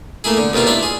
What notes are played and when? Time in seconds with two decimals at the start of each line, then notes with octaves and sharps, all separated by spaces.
0.24 A3 A#3 E4 G#4
0.37 D3
0.53 D#2 B2 D#3 E4 F4
0.67 D4 E4 F4 E5
0.83 G#4